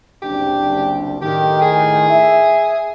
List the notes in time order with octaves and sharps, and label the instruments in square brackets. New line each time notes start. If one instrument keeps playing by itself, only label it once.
[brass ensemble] F#1 C2 D4 [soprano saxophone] G4
[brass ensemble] A2 D#3 [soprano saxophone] G4
[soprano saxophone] G#4
[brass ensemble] E5